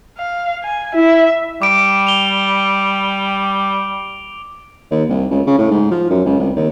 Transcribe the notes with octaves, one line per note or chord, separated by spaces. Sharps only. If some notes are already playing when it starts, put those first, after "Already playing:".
F5
G#5
E4 E5
G3 D6 D7
F7 G7
D#2
C2
C#2
C#3
A2
G#2
F3
F#2
C#2
C2
D#2